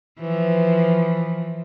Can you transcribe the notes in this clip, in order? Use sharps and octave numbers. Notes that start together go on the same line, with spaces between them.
E3 F3